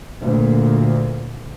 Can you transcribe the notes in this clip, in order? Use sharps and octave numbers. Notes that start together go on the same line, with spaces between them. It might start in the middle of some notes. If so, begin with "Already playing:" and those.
D2 A#2